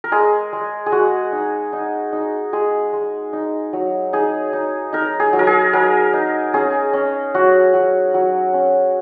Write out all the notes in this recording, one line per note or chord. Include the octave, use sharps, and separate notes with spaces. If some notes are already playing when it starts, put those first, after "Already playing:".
A#4
G#3 G#4
G#3
G#4
G#3 F#4
D#4
D#4
D#4
G#3 G#4
G#3
D#4
F#3
D#4 G#4
D#4
D#4 A#4
G#4
F#3
A#4
G#4
F#3 A#4
D#4
C#4 G#4
C#4
F#3 F#4
F#3
F#3
C#4